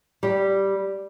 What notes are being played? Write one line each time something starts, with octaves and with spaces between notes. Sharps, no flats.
G3